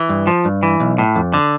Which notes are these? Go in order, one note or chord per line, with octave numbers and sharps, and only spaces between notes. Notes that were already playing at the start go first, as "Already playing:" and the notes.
Already playing: E3
G2
F3
G2
E3
B1
A2
F2
D3